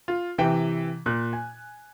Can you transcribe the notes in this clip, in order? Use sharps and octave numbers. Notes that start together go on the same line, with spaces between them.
F4
C3 E3 G5
A#2 F#6
G#5